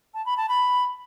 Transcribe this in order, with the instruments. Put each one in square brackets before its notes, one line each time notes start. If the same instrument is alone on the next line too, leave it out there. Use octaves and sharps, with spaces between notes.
[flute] A5
B5
A5
B5